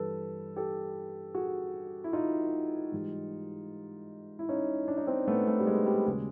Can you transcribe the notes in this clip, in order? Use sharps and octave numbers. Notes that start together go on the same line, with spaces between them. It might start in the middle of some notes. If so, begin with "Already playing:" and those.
Already playing: G2 E3 G3 A4 B4
G4 A4
F#4 G#4
E4
D#4 F4
G#2 E3 G3
E4
C#4 D#4
D4
D#4
C4 D4
A3 B3
A3 B3
G3
G#3
G3
D#2 C#3 F#3 G#3